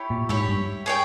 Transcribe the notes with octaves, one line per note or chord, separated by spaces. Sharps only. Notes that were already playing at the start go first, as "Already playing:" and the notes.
Already playing: E4 G4 C#5
A#2
G#2 E4 G4 C#5
G2
G#4 C#5 G5